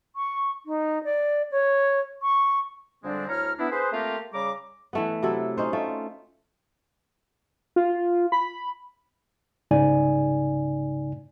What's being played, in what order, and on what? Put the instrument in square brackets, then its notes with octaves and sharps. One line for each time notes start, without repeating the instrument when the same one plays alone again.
[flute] C#6
D#4
D5
C#5
C#6
[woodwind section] F2 D3 G3 G#3 C4 D4
D2 E4 C#5 A#5 F6
B3 D4 E4
G#4 B4 C5
A3 A#3 C4 F4 G4 A#4
C#3 G3 G#4 A#5 D6
[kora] E3 A3 B3
C3 F#3 E4 A4
C#4 D#4 C5
A3 F4
[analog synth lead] F4
B5
[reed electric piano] C2 G#2 C#3 D#4 D5 G#5